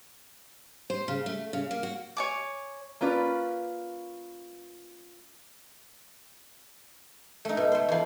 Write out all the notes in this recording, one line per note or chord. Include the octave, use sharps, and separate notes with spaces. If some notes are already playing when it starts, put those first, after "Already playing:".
C5
C#3
A3
C#3
A#3
F#4
C#5 G#5 D6
A#3 C#4 F4 B4 D5
A3 D#4
B2
A3 C5
E2 F3